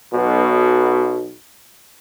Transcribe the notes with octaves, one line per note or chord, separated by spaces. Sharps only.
B1 B2